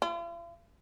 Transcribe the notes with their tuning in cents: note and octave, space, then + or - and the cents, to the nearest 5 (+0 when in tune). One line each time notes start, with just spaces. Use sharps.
F4 -45